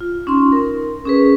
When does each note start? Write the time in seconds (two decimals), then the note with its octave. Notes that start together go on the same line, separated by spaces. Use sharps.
0.01 F4
0.27 C#4 D#4 F4 C6
0.52 A#4
1.05 C#4 G#4 B4